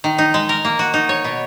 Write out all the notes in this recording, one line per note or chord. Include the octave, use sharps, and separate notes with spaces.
D#3
D#4
G#3
A#4
A#3
F#4
D#4
C#5
B2